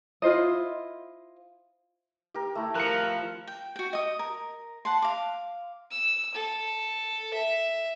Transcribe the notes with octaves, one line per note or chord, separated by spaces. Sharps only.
E4 F4 C5 D#5
G4 A#4
A3 E4
F3 A#4 F#6 C#7
G5
F#4 G5
D#5 D#6
A#4
F#5 A5 C6
F5 D6
E6
A4
E5